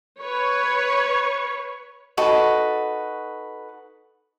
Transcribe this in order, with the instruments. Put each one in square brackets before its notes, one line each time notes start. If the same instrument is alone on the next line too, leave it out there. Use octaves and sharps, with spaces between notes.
[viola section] B4 C#5
[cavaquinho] D#4 F#4 A4 B4